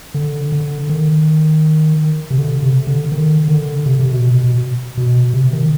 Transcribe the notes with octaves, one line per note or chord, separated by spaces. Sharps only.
D3
D3
D#3
C3
D3
C3
D3
D#3
D3
C3
C3
B2
B2
B2
C3
D#3